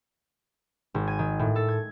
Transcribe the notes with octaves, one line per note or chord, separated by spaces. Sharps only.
G#1
G#5
D#3
A2
A4
G#6